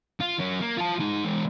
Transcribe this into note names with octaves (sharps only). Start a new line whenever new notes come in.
F4
F#3 C#4
A#3
F4 A5
D#4 G#4
E3 G#3